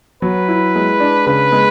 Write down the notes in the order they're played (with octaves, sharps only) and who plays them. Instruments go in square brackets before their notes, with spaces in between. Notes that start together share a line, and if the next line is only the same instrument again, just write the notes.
[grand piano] F#3 [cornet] B4
[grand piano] E4
G#3
D4
[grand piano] C#3 [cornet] B4
[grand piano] G#3